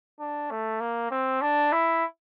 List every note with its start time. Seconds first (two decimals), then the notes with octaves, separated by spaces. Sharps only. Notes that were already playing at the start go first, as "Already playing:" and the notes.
0.19 D4
0.50 A3
0.80 A#3
1.11 C4
1.41 D4
1.72 E4